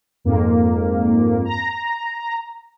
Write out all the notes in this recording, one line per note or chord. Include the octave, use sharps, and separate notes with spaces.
F2 G#2 A#3
A#5